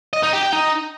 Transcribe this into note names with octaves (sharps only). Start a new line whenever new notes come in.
D#5
D#4
G4
G5
D#4